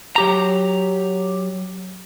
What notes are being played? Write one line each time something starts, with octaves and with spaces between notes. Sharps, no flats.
F#3 G4 A#5